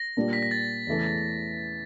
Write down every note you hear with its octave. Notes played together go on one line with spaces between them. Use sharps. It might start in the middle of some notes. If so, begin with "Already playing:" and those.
Already playing: A#6
A#2 G3 A#3 D4
B6
A#6
A6
E2 C#3 E3 A3 C#4